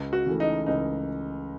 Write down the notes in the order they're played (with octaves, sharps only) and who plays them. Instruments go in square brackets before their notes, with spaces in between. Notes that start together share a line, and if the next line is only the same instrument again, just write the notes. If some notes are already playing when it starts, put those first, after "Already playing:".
Already playing: [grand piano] C#2
[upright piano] F#4
[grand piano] C#3 E3 A3
[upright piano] D#4
[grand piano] C#2 [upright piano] D#4